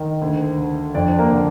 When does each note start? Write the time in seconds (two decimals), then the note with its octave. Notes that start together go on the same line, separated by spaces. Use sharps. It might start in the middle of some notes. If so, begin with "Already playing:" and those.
Already playing: D#3
0.22 D2
0.58 D3
0.95 F2 D4 D5
1.19 A#3 A#4
1.31 D3